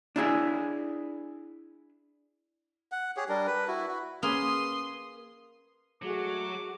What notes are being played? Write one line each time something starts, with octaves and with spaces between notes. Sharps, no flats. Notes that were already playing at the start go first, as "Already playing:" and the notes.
D4 E4 G#4
F#5
G4 G#4 C#5
G3 D4 A#4
B4
E4 F#4
F#4
A#3 C#4 G#4 B4 C6 D#6
F#3 G#3 A3 F#4 G#4 D6